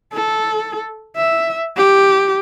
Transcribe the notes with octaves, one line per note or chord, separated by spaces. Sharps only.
A4
E5
G4